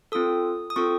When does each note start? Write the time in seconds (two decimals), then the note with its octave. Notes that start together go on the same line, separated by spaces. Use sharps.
0.12 C4 F4 A4 D#6
0.70 D#6
0.76 C4 F4 A4 C#6